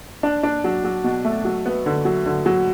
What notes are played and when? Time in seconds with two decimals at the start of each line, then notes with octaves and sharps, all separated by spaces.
0.23 D4
0.43 D4
0.64 F#3
0.84 F#3
1.04 B2
1.25 A3
1.45 F#3
1.66 B3
1.86 D3
2.05 F#3
2.26 D3
2.46 F#3